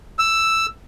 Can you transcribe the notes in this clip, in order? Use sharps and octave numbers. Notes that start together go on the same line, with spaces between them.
E6